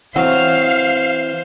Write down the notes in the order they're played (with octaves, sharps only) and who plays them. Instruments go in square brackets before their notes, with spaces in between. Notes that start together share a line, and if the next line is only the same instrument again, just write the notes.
[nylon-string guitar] E3 C4 [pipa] F#3 [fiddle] C5 [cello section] F5